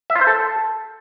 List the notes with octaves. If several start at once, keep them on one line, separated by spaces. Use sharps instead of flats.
E5
F4
C5
A4